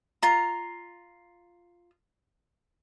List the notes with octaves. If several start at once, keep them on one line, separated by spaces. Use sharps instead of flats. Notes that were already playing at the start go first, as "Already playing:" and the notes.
F4 A#5